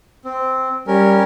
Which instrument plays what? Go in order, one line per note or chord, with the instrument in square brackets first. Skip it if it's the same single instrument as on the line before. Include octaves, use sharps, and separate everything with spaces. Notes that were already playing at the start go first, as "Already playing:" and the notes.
[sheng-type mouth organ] C4
[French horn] G3 [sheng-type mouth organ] C#4 A#4